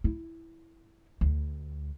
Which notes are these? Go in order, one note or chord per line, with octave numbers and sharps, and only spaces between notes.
E4
D2